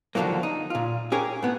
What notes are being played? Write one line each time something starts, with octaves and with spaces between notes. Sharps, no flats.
D#2 D3 D#3 F3 F#3 A#3
D#4
A#2 F4
C#4 G4 G#4 A#4 C#5
A2 B3